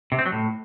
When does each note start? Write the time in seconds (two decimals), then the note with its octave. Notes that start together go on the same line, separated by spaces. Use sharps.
0.12 C3
0.19 C4
0.26 F#3
0.32 A2